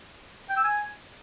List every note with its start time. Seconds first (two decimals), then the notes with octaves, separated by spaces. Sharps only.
0.50 G5
0.57 E6
0.64 G#5